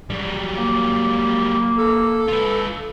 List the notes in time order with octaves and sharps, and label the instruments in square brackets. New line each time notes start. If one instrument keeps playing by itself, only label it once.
[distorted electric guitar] F#3 G3
[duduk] A#3
[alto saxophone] A4
[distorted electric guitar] F4 B4